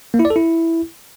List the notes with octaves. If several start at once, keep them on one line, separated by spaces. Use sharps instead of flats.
A#3
E4
D5
A4
E4